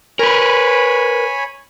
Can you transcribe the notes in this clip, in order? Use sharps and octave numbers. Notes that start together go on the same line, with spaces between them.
A#4 B4 C#5 G#5 B5